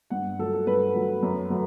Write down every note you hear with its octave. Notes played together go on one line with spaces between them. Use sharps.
G2 F#5
F#3 A3 A4
A4
G2 B4
F#3 A3
F#2
F#3 A3